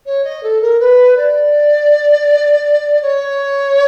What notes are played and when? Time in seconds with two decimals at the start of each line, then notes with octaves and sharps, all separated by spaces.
0.06 C#5
0.24 D#5
0.43 A4
0.61 A#4
0.79 B4
1.17 D5
3.02 C#5